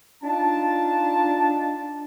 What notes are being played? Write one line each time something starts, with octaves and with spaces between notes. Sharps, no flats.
D4 D#4 F4 A5